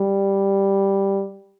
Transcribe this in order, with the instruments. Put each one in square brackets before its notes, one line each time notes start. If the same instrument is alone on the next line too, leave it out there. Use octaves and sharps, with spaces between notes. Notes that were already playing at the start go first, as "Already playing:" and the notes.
Already playing: [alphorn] G3